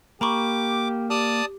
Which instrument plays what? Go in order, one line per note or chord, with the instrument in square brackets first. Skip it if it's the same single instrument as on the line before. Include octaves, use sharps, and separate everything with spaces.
[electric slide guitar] A#3 [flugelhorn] G4 [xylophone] A#5 B5 C#6 [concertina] D6
[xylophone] G4 [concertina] D5 A5 D#6